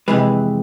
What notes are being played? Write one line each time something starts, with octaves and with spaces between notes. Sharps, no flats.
F2 C3 E3 G#3 B4